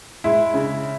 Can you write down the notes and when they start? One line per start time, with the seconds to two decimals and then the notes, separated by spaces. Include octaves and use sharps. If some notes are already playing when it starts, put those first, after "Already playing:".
0.24 G#3 E4
0.54 C#3